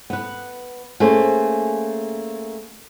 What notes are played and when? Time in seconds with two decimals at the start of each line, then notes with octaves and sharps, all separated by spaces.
0.10 B3 B4
1.00 A3 A#3 C#4 G#4 C5